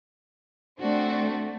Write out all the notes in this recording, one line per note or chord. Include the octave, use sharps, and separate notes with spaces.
A3 C4 D4 F#4